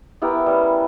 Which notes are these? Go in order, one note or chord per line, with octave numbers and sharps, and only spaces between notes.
B3 E4 G4 A#4
G3 C#4